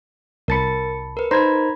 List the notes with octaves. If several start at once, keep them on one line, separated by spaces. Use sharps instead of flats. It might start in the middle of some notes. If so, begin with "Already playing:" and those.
C2 A#4 A5 B5 A6 C#7
A#4 B4
D#4 A#4 C5 A#5 B5 G#6